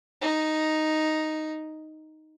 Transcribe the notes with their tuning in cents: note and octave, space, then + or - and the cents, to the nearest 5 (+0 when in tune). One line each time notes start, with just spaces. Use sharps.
D#4 +0